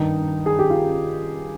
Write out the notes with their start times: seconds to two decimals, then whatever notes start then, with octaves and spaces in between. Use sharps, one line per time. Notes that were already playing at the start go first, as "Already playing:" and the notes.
Already playing: G2 D#3 D#4
0.46 G#4
0.59 G4
0.70 F4